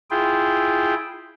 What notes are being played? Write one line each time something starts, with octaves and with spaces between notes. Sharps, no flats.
E4 F4 G#4 G5